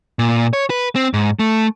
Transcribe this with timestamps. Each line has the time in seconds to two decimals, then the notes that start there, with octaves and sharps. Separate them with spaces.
0.19 A#2
0.53 C#5
0.70 B4
0.96 C4
1.14 G#2
1.39 A3